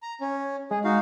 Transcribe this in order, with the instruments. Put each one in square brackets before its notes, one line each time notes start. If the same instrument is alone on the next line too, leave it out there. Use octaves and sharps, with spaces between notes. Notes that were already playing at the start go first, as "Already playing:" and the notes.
[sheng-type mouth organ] A#5
C#4
[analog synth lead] G#3 [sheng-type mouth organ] G#4
[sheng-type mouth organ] D#4 F#4 F5